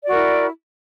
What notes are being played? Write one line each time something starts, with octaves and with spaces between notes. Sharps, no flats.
E4 F#4 A#4 D5